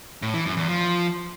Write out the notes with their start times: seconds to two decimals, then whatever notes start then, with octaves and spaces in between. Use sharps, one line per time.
0.22 A2
0.34 E3
0.45 F#2
0.57 E2
0.68 F3